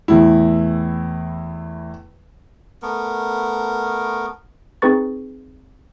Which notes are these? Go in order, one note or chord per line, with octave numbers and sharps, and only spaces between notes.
E2 A2 E4
A3 B3 A#4
C4 D#4 G#4 B4 C#6 A6